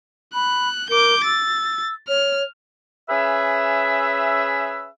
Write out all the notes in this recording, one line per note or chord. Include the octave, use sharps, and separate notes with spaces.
B5 F#6
A#4 D6 G6
E6 A6
C#5 F6
C#4 G#4 B4 E5